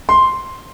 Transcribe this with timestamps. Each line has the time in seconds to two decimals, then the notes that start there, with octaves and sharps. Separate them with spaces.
0.09 C6